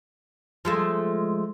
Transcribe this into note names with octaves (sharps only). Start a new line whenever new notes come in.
F3 G#3 A3